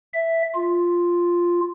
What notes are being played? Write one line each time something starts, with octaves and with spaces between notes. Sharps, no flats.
E5
F4